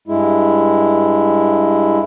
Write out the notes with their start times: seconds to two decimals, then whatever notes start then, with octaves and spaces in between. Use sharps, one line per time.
0.08 G2 G#3 E4